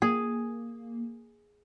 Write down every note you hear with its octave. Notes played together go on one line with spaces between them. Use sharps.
A#3 G#4